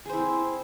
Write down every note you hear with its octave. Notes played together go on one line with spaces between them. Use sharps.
C4 E4 G#4 C5